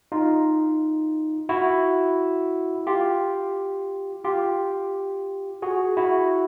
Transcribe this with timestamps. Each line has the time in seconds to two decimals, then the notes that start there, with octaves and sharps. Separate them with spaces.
0.12 D#4 F4
1.49 E4 F#4
2.87 F4 G4
4.24 F4 G4
5.62 F#4 G#4
5.97 E4 F#4